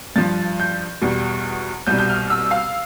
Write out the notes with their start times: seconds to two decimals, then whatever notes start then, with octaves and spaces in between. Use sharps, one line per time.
0.16 G2 F3 A6
0.60 G6
1.01 E2 B2 G3
1.87 C2 B2 G3 G6
1.99 G6
2.09 F6
2.30 E6
2.51 F5